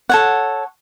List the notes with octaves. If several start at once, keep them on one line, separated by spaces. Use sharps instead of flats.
A4 C#5 F#5